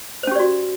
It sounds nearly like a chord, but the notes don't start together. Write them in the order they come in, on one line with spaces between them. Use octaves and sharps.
C5 C#4 G4 D5 F#4